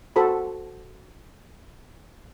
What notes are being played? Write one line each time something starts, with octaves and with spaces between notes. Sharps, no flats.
F#4 A4 C5 B5